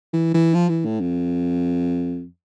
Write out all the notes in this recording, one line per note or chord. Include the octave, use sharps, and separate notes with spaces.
E3
E3
F3
E3
A2
F2